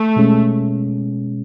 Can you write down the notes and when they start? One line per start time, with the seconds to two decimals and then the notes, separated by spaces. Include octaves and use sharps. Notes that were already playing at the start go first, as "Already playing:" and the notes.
Already playing: A3
0.16 B2 G#3 C#4